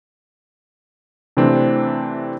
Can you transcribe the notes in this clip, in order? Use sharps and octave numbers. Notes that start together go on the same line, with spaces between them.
C3 E3 A3 C4 D4